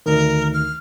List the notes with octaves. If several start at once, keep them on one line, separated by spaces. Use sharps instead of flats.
D2 D#3 A#4
F6